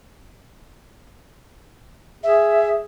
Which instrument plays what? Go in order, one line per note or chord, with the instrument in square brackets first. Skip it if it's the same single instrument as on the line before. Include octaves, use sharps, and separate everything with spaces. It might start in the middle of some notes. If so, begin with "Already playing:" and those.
[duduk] G#4 [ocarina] E5